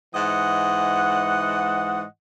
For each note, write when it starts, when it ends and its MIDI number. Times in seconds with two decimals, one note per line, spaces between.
0.15 2.05 44
0.15 2.05 52
0.15 2.05 75
0.15 2.05 78